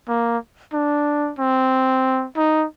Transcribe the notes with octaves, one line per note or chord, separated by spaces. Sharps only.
A#3
D4
C4
D#4